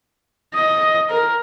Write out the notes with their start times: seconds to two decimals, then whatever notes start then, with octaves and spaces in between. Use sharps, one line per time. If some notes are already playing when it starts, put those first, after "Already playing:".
0.55 D#5
1.10 A#4